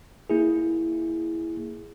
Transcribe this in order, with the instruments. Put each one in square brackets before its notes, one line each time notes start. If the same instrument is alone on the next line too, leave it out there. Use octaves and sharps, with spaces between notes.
[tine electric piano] A#3 E4 G#4